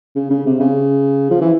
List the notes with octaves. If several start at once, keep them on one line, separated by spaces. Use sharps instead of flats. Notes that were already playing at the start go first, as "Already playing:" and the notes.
C#3
C#3
C3
C#3
F3
E3